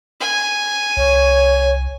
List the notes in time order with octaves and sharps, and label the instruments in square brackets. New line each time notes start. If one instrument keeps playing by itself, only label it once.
[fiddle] G#5
[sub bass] C2 [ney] C#5